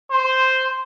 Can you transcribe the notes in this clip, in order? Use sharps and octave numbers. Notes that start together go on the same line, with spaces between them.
C5